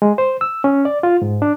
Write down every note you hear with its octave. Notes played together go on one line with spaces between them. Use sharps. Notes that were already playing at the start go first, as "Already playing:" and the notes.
G#3
C5
E6
C#4
D5
F4
G#2
D4